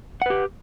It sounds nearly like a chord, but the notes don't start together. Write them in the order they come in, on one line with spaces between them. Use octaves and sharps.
F#5 B4 G4